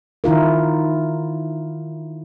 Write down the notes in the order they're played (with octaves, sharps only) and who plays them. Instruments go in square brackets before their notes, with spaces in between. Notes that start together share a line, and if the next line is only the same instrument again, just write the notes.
[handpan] D#3 E4 F4 A#4